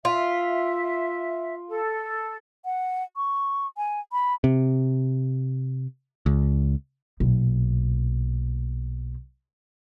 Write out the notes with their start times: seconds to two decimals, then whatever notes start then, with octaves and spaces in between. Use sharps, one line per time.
0.05 F4 E5
1.68 A4
2.65 F#5
3.16 C#6
3.77 G#5
4.12 B5
4.44 C3
6.26 C#2
7.20 B1 A#2